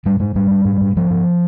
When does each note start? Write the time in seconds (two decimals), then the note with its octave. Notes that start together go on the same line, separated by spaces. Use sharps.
0.06 G#2 G3
0.20 G#2 G#3
0.35 G#2 G3
0.51 G#2
0.65 G#2
0.81 G#2
0.96 G#2 F3
1.10 G#2